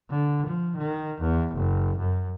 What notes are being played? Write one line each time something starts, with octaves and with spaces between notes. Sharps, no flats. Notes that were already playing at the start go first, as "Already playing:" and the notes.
D3
F3
D#3
E2
F#1
F#2